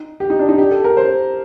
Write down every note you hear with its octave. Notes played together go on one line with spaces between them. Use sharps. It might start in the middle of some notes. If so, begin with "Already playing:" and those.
Already playing: D#4
G4
D#4
D4
D#4
G4
A4
A#4
C5